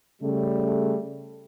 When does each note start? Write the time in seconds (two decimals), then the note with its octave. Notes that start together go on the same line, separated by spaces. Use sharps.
0.22 C#3 G3 A3